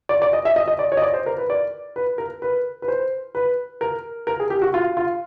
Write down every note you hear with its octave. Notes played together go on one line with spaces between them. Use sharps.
D5
D5
D#5
E5
D#5
D#5
D5
C#5
D#5
D5
C5
A#4
B4
D5
B4
A#4
B4
B4
C5
B4
A#4
A#4
G#4
G4
F#4
F4
F4